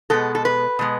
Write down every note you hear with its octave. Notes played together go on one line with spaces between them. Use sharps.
B2 G#3 B3 A4
A4
B4
B2 G#3 B3